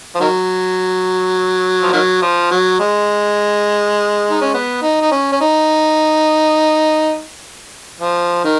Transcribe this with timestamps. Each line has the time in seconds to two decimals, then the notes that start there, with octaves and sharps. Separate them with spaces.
0.15 F3
0.20 D#3 F#3
1.82 F3
1.93 D#3 F#3
2.22 F3
2.51 F#3
2.80 G#3
4.30 D#4
4.41 C#4
4.54 B3
4.82 D#4
5.01 D#4
5.11 C#4
5.32 C#4
5.41 D#4
8.00 F3
8.44 D#3